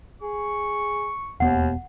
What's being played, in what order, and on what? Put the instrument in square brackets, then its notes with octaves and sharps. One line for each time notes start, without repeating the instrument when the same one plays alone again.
[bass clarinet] G#4 [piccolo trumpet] C#6
[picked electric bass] E1 B3 [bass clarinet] D#2 [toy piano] F#5